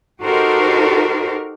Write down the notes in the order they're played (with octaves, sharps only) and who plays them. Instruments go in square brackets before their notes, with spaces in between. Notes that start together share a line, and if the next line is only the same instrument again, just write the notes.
[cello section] D#4 F#4 G4 A4 A#4 C5